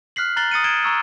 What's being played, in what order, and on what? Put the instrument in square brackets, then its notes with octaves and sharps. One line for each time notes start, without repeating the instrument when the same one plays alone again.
[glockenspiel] F6 F#6 B6 C7 F#7
A#5 F#6 A6 C7 F#7 G7
D#6 A6 C#7 D#7
G#6 D7 E7 G7
A#5 C#6 E6